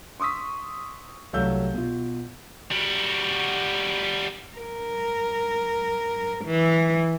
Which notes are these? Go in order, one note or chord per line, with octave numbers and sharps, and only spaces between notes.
C6 C#6 D#6 E6 B6
C2 F#3 A3 F5 E6 G6
B2 F4
G3 F#4
A#4
E3